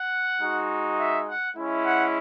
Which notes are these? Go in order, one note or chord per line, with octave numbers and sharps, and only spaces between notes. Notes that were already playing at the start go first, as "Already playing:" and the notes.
Already playing: F#5
G#3 D#4 F#4
E5
F#5
G#3 C#4 E4
F#5